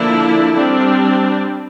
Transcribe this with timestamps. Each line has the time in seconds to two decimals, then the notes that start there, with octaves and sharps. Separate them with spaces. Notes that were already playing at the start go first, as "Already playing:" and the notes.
Already playing: D3 F3 A#3 D4 E4
0.55 G3 C4 D4